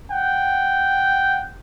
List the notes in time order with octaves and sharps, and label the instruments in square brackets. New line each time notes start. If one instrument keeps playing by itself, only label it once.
[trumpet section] F#5 G5